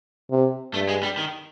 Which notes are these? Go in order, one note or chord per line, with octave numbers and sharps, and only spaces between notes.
C3
G2 A3
G#3
G3
D#3